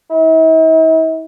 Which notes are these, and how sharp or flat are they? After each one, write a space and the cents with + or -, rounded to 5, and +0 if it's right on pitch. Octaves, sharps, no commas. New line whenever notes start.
E4 -45